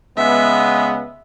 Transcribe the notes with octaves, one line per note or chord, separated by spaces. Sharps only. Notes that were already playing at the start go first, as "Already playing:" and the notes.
C#3 G#3 B3 E5